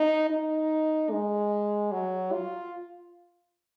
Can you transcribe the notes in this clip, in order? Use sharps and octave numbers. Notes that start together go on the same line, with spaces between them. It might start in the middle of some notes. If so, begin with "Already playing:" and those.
Already playing: D#4
D#4
G#3
F#3
F4